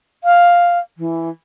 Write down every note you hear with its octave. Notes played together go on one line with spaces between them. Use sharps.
F5
E3